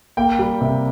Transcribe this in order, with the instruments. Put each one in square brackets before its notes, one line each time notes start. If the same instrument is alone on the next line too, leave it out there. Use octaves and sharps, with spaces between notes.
[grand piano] A#3 G5
G3
C3